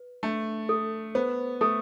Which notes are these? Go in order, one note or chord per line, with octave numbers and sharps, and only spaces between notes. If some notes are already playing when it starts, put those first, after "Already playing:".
Already playing: B4
A3 D4
A4
B3 C5
A3 A4